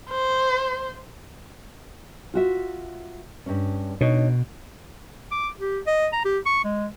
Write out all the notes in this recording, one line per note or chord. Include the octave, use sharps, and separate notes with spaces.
C5
F4 F#4 E5
G2 C#4
B2 D4 D#4 C#5
D6
G4
D#5
A#5
G4
C#6
G#3